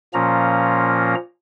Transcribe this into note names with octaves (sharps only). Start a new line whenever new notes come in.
A#2 F3 A#3 C#4 A#5